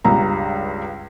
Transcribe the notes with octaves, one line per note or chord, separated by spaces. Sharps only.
C#2 G2 A#5